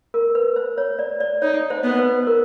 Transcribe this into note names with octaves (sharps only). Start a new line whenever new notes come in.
A#4
B4
C5
C#5
D5
D5
D#4 C#5
C5
B3
C5
B4
A#4